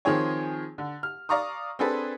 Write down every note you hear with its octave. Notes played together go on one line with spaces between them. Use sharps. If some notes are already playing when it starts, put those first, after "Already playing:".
D#3 F3 C4 G#4 C#5
D3
F6
D5 F5 A#5 C#6 D#6
C4 D4 G#4 A4 B4